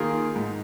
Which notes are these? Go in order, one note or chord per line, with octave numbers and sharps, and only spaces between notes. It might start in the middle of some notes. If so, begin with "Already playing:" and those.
Already playing: D#3 A#3 F4 G#4
G#2